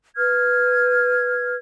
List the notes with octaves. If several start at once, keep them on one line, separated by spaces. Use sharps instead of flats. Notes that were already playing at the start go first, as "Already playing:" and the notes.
B4 F6 G#6